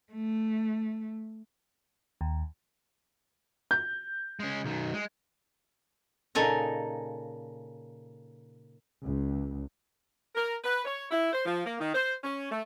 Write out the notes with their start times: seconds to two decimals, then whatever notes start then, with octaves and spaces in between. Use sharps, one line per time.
0.13 A3
2.21 D#2
3.71 G6
4.40 G#3 C#4
4.64 B1 D#3
4.94 G#3
6.35 A#2 C#3 D#4 A4 G#5 A#5
9.03 C#2
10.35 A#4
10.63 B4
10.85 C#5
11.10 E4
11.33 C5
11.46 F3
11.65 A#3
11.80 D#3
11.94 C5
12.23 C#4
12.50 A3